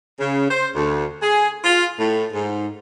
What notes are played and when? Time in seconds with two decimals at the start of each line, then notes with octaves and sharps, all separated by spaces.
0.19 C#3
0.49 C5
0.75 D2
1.22 G#4
1.64 F4
1.98 A2
2.33 G#2